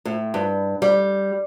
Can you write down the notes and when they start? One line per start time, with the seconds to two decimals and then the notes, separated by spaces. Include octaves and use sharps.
0.05 A2
0.34 G2
0.82 G3